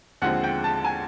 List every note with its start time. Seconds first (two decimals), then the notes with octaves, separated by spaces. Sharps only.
0.22 D#2 D3 F3 G#3 C4 F#5
0.44 G5
0.64 A5
0.84 G#5